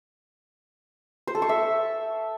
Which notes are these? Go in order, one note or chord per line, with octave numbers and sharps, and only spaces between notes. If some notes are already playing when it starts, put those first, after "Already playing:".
C5
A4
C#6
E5